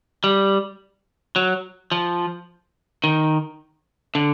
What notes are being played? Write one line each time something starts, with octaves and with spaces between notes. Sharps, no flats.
G3
F#3
F3
D#3
D3